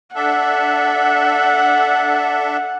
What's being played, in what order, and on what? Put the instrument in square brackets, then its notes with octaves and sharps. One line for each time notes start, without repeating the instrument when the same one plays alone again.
[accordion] D4 A4 E5 [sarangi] F#5